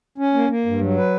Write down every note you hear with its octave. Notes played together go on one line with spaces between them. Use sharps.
C#4
A#3
A#3
G2
F#3
B4